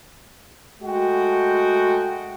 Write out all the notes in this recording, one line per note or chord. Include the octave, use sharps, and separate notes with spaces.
G#3 A3 F#4 G5